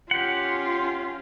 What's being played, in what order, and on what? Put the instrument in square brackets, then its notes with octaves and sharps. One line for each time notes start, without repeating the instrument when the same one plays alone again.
[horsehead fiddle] C#4 F4 [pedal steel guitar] G4 F#5